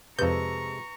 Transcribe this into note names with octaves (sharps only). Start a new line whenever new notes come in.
F2 C3 G#3 A4 B4 A#5 C#6 G6